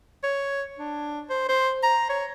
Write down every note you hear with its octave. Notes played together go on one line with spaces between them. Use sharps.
C#5
D4
C5
C5
A#5
C#5